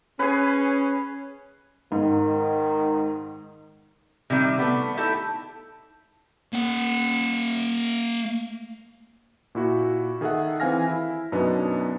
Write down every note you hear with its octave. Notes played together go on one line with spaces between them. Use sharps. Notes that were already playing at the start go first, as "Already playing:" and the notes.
C#4 G#4 B4
G#2 D#3
C3 D#3 G3
A3 B3
D#4 E4 G4 A4
A#3 F#5
A#2 E4 F#4
D#3 G#4 A4 E5 F#5
E3 C4 F5 G#5 F6 A#6
E4
F#2 B2 B3 D4 D#4